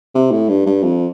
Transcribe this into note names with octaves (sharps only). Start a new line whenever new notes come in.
C3
A2
G2
G2
F2